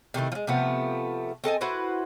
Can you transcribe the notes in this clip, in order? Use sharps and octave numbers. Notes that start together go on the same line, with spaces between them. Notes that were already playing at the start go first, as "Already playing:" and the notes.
C3 D#3 A3 E4
F3 G#3
C3 F3 A3 B3
C4 A4 D#5 G#5
E4 F#4 B4 C5